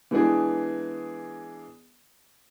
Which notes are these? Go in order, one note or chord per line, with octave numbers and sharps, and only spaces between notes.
E3 G#3 B3 D4 G#4